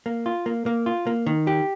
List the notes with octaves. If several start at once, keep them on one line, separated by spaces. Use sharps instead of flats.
A#3
F4
A#3
A#3
F4
A#3
D#3
G4